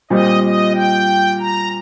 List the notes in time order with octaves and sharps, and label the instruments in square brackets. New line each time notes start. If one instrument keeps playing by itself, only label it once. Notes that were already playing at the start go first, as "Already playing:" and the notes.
[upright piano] A#2 G3 C4 [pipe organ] D#5
[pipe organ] D#5
G5
A#5